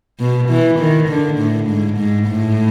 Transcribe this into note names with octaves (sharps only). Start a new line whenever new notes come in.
B2
E3
D#3
D3
A2
G#2
G#2
A2